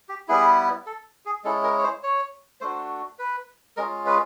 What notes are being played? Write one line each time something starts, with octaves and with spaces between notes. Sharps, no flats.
G4
G3 B3 E4 G#4
A4
G#4
G#3 C#4 E4 A4
A#4
C#5
C5
C#5
A3 D4 F#4 C5
B4
G#3 C#4 F4 A#4
B4